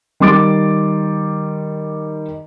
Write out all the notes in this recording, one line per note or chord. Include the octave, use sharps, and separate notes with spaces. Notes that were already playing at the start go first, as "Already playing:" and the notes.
D#3 G3 C6 D6 A6 D7